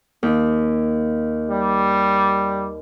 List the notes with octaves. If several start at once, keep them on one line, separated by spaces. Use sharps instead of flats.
D#2
G3